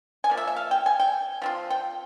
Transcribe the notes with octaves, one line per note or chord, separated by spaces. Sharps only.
G#5
F3 A#3
E5
E5
F5
G5
G#5
G5
F3 C4 F4
G5